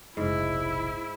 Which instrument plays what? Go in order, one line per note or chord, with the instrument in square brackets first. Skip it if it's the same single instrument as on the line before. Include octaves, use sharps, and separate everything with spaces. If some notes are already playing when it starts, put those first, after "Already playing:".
[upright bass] F1 B1 [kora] G#2 [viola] E4